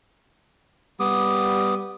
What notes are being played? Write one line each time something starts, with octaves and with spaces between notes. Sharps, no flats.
G3 B3 D6 D#6